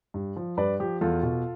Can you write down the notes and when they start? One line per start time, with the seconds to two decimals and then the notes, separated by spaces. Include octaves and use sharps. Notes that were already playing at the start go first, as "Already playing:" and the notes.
0.14 G2
0.36 F3
0.57 G2 B4 D5
0.80 F3 G4
1.01 E2 F4 A4
1.23 B2